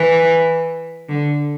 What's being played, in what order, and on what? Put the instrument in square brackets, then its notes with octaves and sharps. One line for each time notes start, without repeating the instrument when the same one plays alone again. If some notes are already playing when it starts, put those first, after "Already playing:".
Already playing: [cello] E3
D3